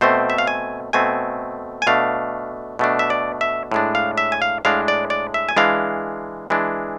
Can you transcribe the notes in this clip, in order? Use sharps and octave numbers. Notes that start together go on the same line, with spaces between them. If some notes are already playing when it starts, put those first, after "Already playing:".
B2 A3 C4 C5
E5
F5
G#5
B2 A3 C4 G#5
G#5
B2 A3 D4 F5
B2 A3 D4
E5
D5
E5
A2 G#3 D4
F5
E5
G#5
F5
A2 G#3 D4 F5
D5
D5
E5
G#5
E3 G#3 D4 F5
E3 G#3 D4